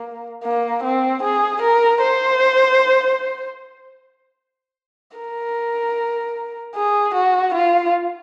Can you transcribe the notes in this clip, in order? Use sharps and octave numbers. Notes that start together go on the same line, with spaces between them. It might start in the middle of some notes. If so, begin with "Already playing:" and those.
Already playing: A#3
A#3
C4
G#4
A#4
C5
A#4
G#4
F#4
F4